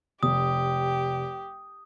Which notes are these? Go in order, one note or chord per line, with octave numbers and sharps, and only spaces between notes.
F1 G4 D#6